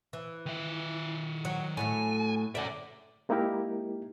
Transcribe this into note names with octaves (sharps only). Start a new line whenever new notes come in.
E3
D#3 E5
F#3
A2 F#3 A3 G#5
F#2 D3 C#5 D5 E5
G#3 A#3 D#4 E4 G4 A#4